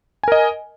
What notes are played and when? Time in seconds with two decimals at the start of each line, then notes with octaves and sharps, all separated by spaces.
0.23 G#5
0.28 A#4
0.32 D#5